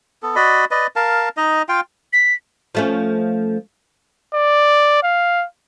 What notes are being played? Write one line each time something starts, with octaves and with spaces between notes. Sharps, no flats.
B3 A4
F#4 D5 D#5 B5
B4 D5 D#5
A#4 F5 A5
D#4 D#5
F4 F5 G5
B6
F3 A3 C#4
D5
F5